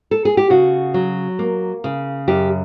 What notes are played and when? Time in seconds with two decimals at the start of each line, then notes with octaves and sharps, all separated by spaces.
0.11 A4
0.25 G#4
0.37 G4
0.50 C#3 F#4
0.94 F#3
1.39 A#3
1.84 C#3
2.28 F#2 G4